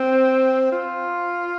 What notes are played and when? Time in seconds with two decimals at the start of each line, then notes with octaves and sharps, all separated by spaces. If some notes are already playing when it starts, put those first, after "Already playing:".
Already playing: C4
0.72 F4